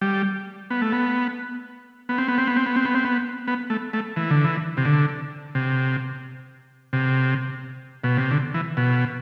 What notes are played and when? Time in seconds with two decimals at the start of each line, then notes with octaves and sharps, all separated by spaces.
0.01 G3
0.70 B3
0.82 A3
0.93 B3
2.09 B3
2.18 C4
2.28 B3
2.38 C4
2.47 B3
2.56 C4
2.66 B3
2.76 C4
2.85 B3
2.95 C4
3.05 B3
3.47 B3
3.70 A3
3.93 A3
4.16 E3
4.31 D3
4.44 E3
4.77 C3
4.85 D3
5.55 C3
6.93 C3
8.04 B2
8.17 C3
8.31 D3
8.54 E3
8.77 B2